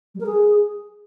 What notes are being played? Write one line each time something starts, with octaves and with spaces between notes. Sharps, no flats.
G3
A#4
G#4